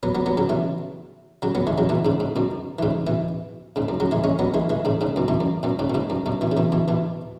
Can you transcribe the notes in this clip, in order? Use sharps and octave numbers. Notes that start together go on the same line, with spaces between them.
F#3 B3
F#3 B3
F#3 B3
C#3 F#3
B2 E3
C#3 F#3
F#3 B3
E3 G#3
C#3 F#3
B2 E3
G#2 C#3
G#2
F#2 B2
E3
G#2 C#3
B2 E3
G#2 C#3
F#2
C#3 F#3
E3 G#3
G#3 C#4
F#3 B3
E3 G#3
E3 G#3
G#2 C#3
G#2 C#3
F#2 B2
B2 E3
F#2
F#2 B2
G#2 C#3
B2
G#2 C#3
F#2
F#2 B2
B2 E3
C#3
B2 E3
B2 E3
B2 E3